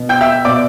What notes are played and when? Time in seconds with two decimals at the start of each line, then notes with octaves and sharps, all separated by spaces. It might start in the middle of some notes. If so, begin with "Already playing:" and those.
Already playing: B2
0.09 G5 G6
0.21 E5 E6
0.45 B2 D5 D6